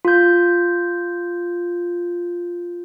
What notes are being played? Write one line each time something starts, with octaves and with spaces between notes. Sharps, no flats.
F4 G6